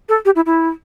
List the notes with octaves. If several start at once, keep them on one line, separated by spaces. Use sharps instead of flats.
A4
G4
E4
E4